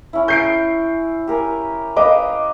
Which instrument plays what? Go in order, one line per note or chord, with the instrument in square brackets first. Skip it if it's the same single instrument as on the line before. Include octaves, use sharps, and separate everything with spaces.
[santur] C#4 E4
[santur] C#6 [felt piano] G6 C7 D7
[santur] G4 A#4 G#5
[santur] B4 F5 G5 [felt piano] D#5 D6